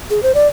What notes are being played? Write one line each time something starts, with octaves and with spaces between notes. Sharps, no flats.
G#4
C5
D5